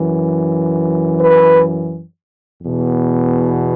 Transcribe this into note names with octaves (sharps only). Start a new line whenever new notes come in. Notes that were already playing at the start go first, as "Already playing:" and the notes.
Already playing: F#2 E3
B4
E2
B2